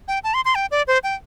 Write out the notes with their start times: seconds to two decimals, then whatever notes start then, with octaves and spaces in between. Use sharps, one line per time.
0.08 G5
0.24 A5
0.34 C6
0.45 C6
0.55 G5
0.71 D5
0.87 C5
1.04 G5